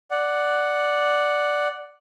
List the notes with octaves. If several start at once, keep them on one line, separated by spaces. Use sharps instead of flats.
D5 F#5